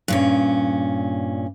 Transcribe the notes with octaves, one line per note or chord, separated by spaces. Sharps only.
G2 A#2 C#4